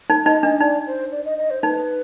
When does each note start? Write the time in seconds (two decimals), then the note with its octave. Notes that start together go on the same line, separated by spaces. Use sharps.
0.10 D#4
0.26 D#4 D#5
0.43 D4 D#5
0.60 D#4 D5
0.87 C5
1.12 D5
1.25 D#5
1.38 D#5
1.50 C5
1.63 D#4 B4